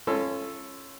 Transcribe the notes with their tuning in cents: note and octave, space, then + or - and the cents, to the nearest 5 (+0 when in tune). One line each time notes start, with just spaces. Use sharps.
C#4 -15 F4 -35 A4 +0